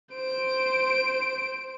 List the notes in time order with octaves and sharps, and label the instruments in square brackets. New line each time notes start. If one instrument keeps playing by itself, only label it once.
[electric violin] C5 D7